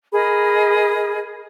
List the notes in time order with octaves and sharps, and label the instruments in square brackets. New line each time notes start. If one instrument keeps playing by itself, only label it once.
[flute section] G#4 A#4 D#5 B5